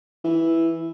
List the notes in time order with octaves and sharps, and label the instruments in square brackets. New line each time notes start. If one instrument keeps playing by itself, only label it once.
[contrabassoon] E3